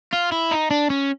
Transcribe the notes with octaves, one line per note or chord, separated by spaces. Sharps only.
F4
E4
D#4
D4
C#4